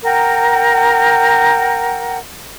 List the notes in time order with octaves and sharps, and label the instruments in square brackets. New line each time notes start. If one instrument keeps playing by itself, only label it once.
[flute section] A#4 F#5 G5 A#5